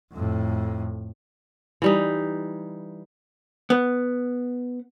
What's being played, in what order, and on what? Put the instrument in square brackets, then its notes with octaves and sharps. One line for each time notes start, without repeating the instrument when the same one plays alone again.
[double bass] F2 A2
[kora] E3 G3 D#4
[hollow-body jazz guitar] B3